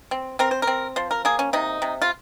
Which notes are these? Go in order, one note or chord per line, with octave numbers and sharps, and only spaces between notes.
C4
C4 A#4
C5
A#4
C4
F3 C5
A#4
A#3 G#4
C#4
C3 D#4
C3
F4